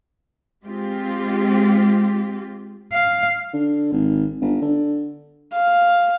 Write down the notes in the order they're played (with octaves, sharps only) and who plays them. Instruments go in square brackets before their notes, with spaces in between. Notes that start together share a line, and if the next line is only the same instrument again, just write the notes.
[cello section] G#3 C4 F4 G4
[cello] F5
[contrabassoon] D3
G#1
G1
D3
[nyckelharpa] F5